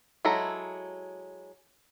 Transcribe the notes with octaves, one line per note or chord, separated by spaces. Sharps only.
F#3 G#3 E4 A4 A#5